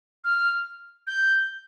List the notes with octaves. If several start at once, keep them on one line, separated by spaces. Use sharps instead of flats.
F6
G6